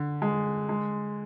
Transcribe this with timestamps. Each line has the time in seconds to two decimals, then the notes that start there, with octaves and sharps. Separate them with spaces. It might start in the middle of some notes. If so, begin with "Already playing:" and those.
Already playing: D3
0.22 G#3
0.69 G#3